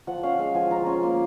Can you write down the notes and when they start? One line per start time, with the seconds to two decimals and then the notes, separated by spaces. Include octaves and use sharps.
0.07 F3 F#5
0.23 C#4 F5
0.39 G#3 F5
0.55 F3 G#5
0.71 F3 A#5
0.86 C#4 C6
1.03 A#3 C6